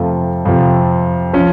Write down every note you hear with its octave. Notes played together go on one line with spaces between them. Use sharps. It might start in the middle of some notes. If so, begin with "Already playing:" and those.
Already playing: F2 C3 F3 A3
F2 C3 F3
F3 C#4